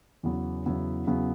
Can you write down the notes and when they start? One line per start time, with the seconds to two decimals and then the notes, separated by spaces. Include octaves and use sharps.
0.23 E2 C#3 F#3 B3 E4
0.66 E2 C#3 F#3 B3 E4
1.07 E2 C#3 F#3 B3 E4